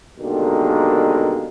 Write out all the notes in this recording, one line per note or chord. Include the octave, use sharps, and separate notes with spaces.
B2 D3 D#3 G3 G#3 A#3